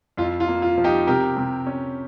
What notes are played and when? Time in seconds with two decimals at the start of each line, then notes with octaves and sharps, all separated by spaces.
0.17 F2 F4
0.40 F4
0.48 A#3
0.62 F4
0.78 F3
0.84 D#4 G4
1.07 C3 G4 A#4
1.36 C3
1.67 C#4